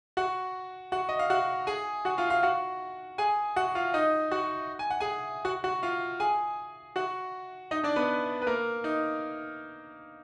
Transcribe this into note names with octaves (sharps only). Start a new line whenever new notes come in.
F#4 F#5
F#4 F#5
D#5
F5
F#4 F#5
G#4 G#5
F#4 F#5
F4 F5
F4 F5
F#4 F#5
G#4 G#5
F#4 F#5
F4 F5
D#4 D#5
F#4 F#5
G#5
F#5
G#4 G#5
F#4 F#5
F#4 F#5
F4 F5
G#4 G#5
F#4 F#5
D#4 D#5
D4 D5
B3 B4
B4
A#3 A#4
D#4